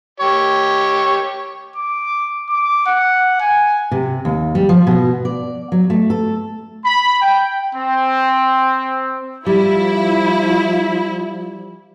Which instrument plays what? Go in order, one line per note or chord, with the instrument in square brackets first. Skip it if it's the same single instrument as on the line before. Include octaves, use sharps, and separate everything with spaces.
[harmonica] G4 C#5
[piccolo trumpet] D6
D6
F#5
G#5
[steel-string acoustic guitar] C3
D#2
G3
F3
B2
D5
F#3
A3
A4
[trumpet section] B5
G5
C4
[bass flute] F3 [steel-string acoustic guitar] G3 [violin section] E4